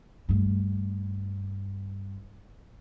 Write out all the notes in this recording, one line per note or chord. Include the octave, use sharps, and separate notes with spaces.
G2 A3